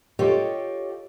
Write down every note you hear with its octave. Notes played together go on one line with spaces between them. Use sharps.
F4 G4 A4 C#5 D#5 G5